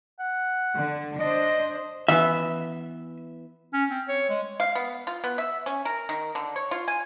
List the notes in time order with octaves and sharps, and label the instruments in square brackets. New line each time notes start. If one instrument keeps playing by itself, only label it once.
[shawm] F#5
[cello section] D3
[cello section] D4 C5 [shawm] D#5
[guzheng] E3 B3 [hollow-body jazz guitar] E5
[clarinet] C#4
C4
C#5
G#3
[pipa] F5
B3
F4
B3
E5
C#4
A#4
D#3
D3
C#5
F4
G#5